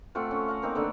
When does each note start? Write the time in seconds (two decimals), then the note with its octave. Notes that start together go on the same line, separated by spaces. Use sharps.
0.15 A3 C4 F4 F#5
0.31 C#4
0.48 F5 F#5 A#5
0.62 A#3 C4 D#4
0.75 D3 A3 B3